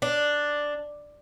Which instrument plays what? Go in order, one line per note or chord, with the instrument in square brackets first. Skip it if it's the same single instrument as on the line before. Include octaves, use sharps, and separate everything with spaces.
[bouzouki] D4